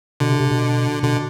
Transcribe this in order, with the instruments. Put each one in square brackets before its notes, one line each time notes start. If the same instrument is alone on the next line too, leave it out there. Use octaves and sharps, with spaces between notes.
[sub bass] B2 [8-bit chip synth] D3
[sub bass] C3
C3
B2
[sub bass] B2 [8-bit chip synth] D3